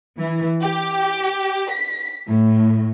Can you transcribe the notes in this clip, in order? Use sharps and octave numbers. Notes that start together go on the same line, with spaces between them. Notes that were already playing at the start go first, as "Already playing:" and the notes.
E3
G4
B6
A2